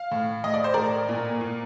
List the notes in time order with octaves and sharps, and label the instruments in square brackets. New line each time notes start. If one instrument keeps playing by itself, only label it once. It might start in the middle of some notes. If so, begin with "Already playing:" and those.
Already playing: [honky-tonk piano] F5
A2
A2 D#5
D5
C5
A2 A#4 D5
A#2
A#2